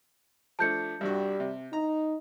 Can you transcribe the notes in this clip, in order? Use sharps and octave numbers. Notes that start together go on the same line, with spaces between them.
F3 A3 D4 A5 G6 C#7
C2 G2 G3 F#4
C3
D#4 A#5